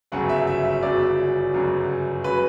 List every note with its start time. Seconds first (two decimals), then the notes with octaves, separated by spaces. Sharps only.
0.12 G1 F#2 C#3 F#3 F#5
0.29 E5
0.47 E5
0.65 E5
0.83 G1 F#2 C#3 F#3 D5
1.53 G1 F#2 C#3 F#3
2.24 C#3 F#3 B4